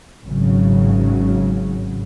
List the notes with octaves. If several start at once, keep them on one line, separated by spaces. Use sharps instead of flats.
G#1 C#3 F#3